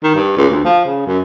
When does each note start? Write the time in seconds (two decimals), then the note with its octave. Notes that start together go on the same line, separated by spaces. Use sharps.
0.03 D#3
0.15 G2
0.37 C#2
0.50 D2
0.65 F3
0.85 C#3
1.06 F#2